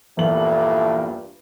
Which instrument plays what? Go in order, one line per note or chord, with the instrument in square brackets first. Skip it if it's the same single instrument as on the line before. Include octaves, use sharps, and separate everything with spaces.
[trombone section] A#1 G2 A#2 [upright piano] E2 F#7 [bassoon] A3